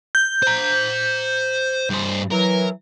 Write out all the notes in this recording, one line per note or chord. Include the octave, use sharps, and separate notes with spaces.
G6
C5 A#5
G2 C5
E3 F#3 A#4